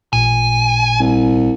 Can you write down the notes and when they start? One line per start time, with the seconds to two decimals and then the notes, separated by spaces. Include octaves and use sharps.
0.13 A1 A#2 G#5
1.00 C2